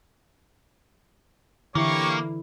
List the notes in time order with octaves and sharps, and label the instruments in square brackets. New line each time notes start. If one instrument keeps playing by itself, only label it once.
[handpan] D3 E3 E4 [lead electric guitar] A#3 [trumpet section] G4 C#5 C#6